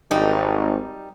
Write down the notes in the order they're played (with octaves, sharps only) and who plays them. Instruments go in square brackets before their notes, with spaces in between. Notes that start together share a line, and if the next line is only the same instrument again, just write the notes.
[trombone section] G#1 [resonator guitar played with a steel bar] G3 D#4